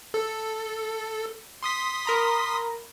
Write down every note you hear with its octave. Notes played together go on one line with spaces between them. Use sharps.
A4
C6 D#6 B6
A#4 A#5 B5